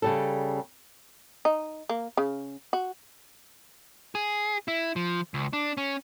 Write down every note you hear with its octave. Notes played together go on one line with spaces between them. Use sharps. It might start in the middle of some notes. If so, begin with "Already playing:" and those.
C#3 G3 A4
D#4
A#3
C#3
F#4
G#4
E4
F3
C#2
D4
C#4